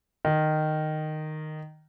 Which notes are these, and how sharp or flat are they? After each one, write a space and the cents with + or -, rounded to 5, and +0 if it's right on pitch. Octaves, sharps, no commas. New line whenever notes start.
D#3 -10